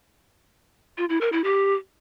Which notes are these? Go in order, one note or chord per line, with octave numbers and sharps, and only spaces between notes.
F4
E4
A#4
E4
G4